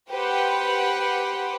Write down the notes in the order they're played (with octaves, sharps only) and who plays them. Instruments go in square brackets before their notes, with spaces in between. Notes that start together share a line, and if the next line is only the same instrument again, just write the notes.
[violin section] G4 B4 C5 F#5 G5